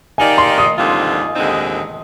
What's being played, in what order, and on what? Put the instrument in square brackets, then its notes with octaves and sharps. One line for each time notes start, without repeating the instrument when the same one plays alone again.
[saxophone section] D#3 A#3 D#4 G4 D5 [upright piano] G#5
[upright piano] C6
D#6
[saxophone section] D#2 D3 G3 C4 F4
D#2 D3 G#3 C4 D#4